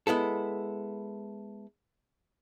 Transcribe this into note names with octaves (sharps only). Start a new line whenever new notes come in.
G#3 B3 E4 A4